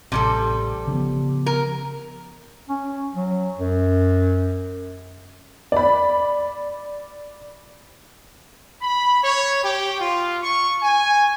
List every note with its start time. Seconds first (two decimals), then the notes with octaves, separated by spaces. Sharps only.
0.12 A1 C3 G3 A4
0.88 C#3 F3 B3
1.46 A#4
2.69 C#4
3.15 F#3
3.58 F#2
5.72 D5 B5
8.82 B5
9.24 C#5
9.63 G4
10.00 F4
10.43 C#6
10.82 G#5